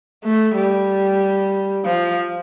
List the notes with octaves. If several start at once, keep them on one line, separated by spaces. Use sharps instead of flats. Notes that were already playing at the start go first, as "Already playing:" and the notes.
A3
G3
F3